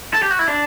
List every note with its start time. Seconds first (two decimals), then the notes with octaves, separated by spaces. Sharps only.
0.14 A4
0.23 G4
0.31 F#4
0.39 E4
0.48 D4